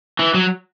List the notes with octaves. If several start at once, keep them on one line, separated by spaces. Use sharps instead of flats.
E3
F#3